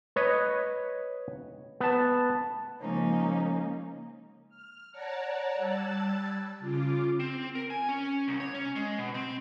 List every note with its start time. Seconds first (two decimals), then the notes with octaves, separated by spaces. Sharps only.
0.16 B4 C#5 D#5
1.80 B3 A5
2.80 C#3 F3 G#3 A#3 C#4 D#4
4.49 F6
4.92 C#5 D5 F#5 A5 A#5
5.56 G3 A5 E6 F#6 G#6 A6
6.59 C#3 F4 D6
7.20 C4
7.55 A#4
7.70 G#5
7.89 C#4
8.28 C2
8.40 C#5
8.54 C#4
8.76 G#3
8.98 B2
9.14 C4